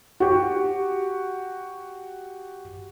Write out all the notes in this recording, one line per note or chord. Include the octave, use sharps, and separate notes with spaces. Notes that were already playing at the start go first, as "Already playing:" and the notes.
F#4 G4